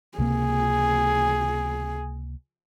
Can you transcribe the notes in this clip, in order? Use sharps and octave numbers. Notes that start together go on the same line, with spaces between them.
C#2 C3 A#3 G#4